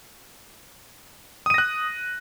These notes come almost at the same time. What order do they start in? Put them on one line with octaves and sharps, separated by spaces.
D#6 D#7 A#6 F#6